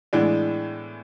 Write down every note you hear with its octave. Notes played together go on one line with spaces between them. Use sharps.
A2 E3 G#3 B3 D4